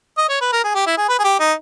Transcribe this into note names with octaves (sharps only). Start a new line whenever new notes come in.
D#5
C#5
B4
A#4
G#4
G4
E4
G#4
B4
G#4
G4
D#4